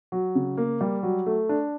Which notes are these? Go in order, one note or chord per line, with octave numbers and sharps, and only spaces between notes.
F#3
C#3
A#3
G3
F#3
A3
D4